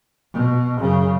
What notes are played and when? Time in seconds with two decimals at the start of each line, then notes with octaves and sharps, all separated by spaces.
0.33 B2
0.78 F#2 C#3